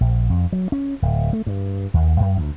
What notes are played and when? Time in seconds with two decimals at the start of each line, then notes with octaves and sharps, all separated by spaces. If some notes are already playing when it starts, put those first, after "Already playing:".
0.01 A#1
0.30 F2
0.53 F#3
0.72 C#4
1.02 D1
1.33 A3
1.47 G2
1.94 D#2
2.20 F#2
2.37 D2